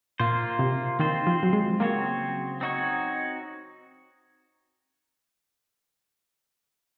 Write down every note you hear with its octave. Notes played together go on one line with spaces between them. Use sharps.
A#2 A#3 F4 C5
C3
D#3 C4 F4 C5
F3
F#3
G#3
C#3 F#3 A#3 C4 F#4 C#5
C4 D#4 F#4 C#5